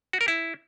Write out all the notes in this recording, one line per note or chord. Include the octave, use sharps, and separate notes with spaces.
F#4
A#4
E4